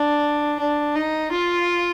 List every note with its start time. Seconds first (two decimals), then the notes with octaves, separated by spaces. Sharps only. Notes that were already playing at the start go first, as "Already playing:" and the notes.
Already playing: D4
0.60 D4
0.96 D#4
1.32 F4